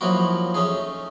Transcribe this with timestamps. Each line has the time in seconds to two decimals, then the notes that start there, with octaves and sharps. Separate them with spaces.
0.01 F3 F#3 A#3 D#4 E4 F#4
0.54 A3 C#4 D#4 G#4